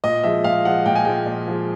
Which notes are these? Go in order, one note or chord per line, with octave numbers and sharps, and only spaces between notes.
A#2 D#5
F3 G#3 E5
A#2 F5
F3 G#3 F#5
A#2 G5
G#5
F3 G#3 G5
A#2
F3 G#3